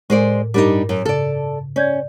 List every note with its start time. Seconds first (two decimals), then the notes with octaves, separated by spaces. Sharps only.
0.10 A2 G#3 A#4 C5 D5 G#5
0.54 G2 G3 D4 D#4 A#4 D6
0.89 F#2
1.05 C#3 A4 D5
1.76 C#4 D5 G6 G#6